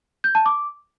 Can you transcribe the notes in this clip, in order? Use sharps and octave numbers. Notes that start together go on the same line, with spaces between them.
G6
A5
D6